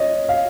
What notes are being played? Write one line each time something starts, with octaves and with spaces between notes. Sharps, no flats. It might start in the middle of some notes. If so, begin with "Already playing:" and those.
Already playing: C#5 D#5
F5